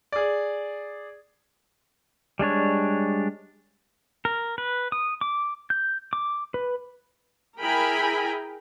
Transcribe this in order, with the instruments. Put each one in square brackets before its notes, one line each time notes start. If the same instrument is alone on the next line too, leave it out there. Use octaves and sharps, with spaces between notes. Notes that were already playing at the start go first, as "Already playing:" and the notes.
[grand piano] G#4 D5
[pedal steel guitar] G3 G#3 D4 C#5
A#4
B4
D#6
D6
G6
D6
B4
[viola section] E4 G#4 A#4 G5 G#5 B5